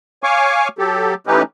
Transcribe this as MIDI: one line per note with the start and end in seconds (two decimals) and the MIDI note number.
0.23 0.68 73
0.23 0.68 77
0.23 0.68 80
0.23 0.68 85
0.23 0.68 86
0.78 1.14 54
0.78 1.14 67
0.78 1.14 69
1.27 1.42 52
1.27 1.42 57
1.27 1.42 61
1.27 1.42 63
1.27 1.42 67
1.27 1.42 71